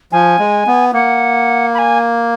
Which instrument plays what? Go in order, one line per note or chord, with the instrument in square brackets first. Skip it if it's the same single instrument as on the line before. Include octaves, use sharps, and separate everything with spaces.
[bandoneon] F3 [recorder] G#5
[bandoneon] G#3
B3
[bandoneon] A#3 [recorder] F#5
[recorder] B5
G#5